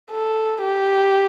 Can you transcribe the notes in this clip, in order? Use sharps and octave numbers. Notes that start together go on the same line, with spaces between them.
A4
G4